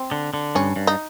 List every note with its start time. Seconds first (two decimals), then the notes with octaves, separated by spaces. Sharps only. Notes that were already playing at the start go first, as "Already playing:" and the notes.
Already playing: C4
0.12 D3
0.34 D3
0.55 G2 C#4
0.76 G2
0.87 D#4